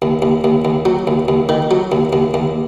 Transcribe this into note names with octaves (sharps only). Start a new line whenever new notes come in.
D#2
D#2
D#2
D#2
F#3
D#2
D#2
D#3
F#3
D#2
D#2
D#2